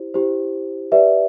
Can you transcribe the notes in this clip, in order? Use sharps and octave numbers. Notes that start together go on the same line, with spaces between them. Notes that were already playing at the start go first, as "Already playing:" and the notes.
Already playing: E4 G4 C5
E4 G4 C5
G4 B4 D5 E5